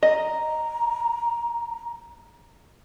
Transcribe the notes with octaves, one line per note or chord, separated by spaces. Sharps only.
D#5 A#5